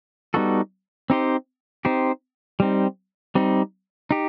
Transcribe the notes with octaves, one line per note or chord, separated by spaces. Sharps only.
G3 B3 D#4 F#4 A4
C4 D#4 G4 C5
C4 D#4 G4 C5
G3 C4 D#4
G3 C4 D#4
D#4 G4